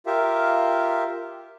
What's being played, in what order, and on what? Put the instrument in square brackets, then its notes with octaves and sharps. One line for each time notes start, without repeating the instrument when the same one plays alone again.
[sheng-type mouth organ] F4 G4 A#4 E5 F5